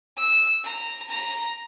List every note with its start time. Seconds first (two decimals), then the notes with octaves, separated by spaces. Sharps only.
0.17 E6
0.64 A#5
1.09 A#5